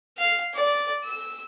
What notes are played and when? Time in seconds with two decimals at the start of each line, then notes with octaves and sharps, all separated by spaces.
0.18 F5
0.54 D5
1.05 E6